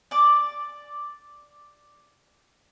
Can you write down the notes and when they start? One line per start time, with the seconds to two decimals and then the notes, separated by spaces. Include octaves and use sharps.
0.11 D5 D6